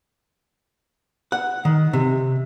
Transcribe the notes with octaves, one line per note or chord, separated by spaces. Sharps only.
F#5
D#3
C3